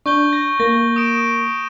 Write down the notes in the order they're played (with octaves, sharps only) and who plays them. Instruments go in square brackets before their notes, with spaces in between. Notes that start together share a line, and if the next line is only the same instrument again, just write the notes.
[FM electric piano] D4 [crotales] C#6 G6 G7
[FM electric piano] A#6
[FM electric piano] A#3 [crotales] A#6
[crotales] D#6 D7 E7